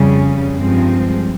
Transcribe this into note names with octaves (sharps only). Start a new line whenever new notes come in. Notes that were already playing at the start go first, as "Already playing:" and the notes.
Already playing: F2 C#3 G3 C#4
G2 F3 G#3 C4